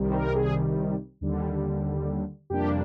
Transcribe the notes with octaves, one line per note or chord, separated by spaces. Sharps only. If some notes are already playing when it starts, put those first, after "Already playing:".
Already playing: C2 C3 D#3 G3
C5
A#4
G#4
D#2 D3 G3
F2 C3 G3 A#3 D4 G4